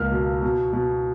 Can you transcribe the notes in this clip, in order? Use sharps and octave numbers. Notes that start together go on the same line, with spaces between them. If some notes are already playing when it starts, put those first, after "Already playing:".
Already playing: C#2 A#3 F6
B2
B2
B2